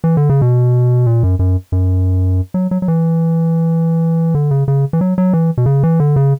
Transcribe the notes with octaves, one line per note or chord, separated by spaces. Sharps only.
E3
D3
C#3
B2
A#2
F#2
F#2
F#2
F#3
F#3
F#3
E3
D3
C#3
C#3
E3
F#3
F#3
E3
B2
C#3
E3
D3
C#3